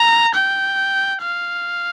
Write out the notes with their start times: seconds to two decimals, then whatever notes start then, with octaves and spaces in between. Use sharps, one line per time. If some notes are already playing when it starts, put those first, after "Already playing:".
Already playing: A#5
0.35 G5
1.22 F5